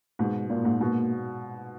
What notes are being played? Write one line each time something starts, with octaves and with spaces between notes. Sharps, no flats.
G#2 B2 G#3
A#2 A#3
G#2
G#2 B2 A#3